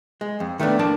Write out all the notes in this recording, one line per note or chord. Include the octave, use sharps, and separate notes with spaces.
G#3
F2
D#3 A3 B3 D4
A2 F3 A#3 D4 A5